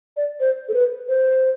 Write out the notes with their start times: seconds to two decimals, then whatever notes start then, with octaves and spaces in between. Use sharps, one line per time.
0.17 D5
0.40 C5
0.68 A4
0.74 B4
1.08 C5